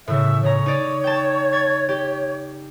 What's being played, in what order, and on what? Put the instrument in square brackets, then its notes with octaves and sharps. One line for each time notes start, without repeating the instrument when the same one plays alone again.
[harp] A2 C#3 [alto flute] E5
[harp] C#3 A#5 [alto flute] C#5
[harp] D#4 D5
G5 A5
G#6 A6
G4